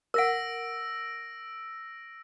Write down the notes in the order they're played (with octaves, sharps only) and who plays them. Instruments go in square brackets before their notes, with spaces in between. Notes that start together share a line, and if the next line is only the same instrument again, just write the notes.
[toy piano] A#4 F#5 [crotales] E6 A#6 D7